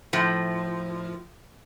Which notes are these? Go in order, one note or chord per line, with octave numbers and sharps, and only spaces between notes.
A2 F3